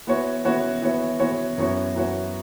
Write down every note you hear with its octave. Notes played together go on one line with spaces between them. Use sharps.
E3 B3 F#4 C#5
E3 B3 F#4 C#5
E3 B3 F#4 C#5
E3 B3 F#4 C#5
F#2 E3 B3 F#4 C#5
F#2 E3 B3 F#4 C#5